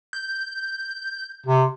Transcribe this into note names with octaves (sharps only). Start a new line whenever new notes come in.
G6
C3